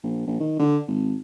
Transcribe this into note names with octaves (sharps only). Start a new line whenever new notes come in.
A#1
A#1
D#3
D3
G#1